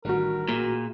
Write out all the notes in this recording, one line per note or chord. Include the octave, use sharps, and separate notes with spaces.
A1 D#3 G3 D4 F#4 A#4
A#2 G#4 E5